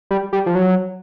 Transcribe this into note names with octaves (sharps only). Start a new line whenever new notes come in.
G3
G3
F3
F#3